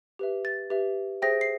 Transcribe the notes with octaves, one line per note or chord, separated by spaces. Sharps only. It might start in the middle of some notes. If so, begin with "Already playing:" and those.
G4 B4 E5
A6
G4 B4 E5
G#4 C5 E5 G5 A#6
C7